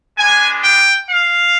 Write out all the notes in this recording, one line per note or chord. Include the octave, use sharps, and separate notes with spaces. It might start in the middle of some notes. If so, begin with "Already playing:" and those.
G#3 B3 D4 G#5
G5
F5